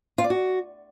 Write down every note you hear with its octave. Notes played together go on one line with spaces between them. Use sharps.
F4
D5
F#4